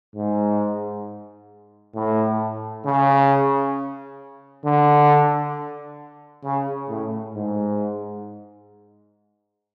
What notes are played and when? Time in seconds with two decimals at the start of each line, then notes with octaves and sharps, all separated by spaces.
0.15 G#2
1.95 A2
2.85 C#3
4.64 D3
6.44 C#3
6.89 A2
7.34 G#2